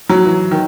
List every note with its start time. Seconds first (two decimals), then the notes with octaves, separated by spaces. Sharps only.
0.10 F#3
0.25 E3
0.51 D#3